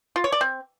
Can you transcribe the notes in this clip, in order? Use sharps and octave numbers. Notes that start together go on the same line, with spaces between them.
F4
C#5
D5
C4